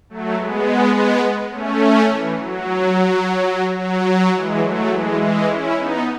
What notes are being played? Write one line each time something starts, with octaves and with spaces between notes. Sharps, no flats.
F#3 A3
G#3 B3
G#3 B3
A3 C#4
E3
F#3
F#3
E3 G#3
F#3 A3
E3 G#3
E3 G#3
C#4 E4
B3 D#4